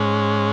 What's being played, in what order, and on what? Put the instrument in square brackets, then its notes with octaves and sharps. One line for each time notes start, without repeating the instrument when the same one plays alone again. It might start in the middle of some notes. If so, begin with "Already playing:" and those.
Already playing: [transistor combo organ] G#2 G#3 C#4